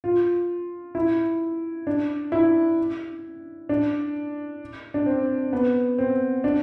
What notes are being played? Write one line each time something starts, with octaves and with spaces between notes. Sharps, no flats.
F4
E4
D4
E4
D4
D4
C4
B3
C4
D4